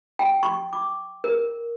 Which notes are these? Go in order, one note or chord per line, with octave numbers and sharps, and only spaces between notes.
G5
C#6
D6
A#4